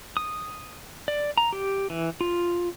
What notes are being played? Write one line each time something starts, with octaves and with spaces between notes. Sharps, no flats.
D#6
D5
A#5
G4
E3
F4